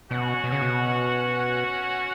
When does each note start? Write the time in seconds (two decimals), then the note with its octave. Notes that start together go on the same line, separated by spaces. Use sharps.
0.11 B2 C#4 F#4 C#5 F#5
0.44 B2
0.52 C#3
0.62 B2